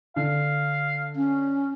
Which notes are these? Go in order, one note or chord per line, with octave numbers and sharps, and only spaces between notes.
D3 F5
C#4